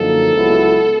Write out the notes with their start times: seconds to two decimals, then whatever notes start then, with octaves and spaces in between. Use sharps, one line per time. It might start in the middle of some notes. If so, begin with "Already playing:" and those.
Already playing: F#2 D3 F3 A#3 D#4 A4
0.33 C#2 C#3 F#3 B3 E4